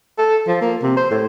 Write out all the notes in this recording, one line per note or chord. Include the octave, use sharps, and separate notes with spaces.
A4
F3
A#3
C3
C5
A2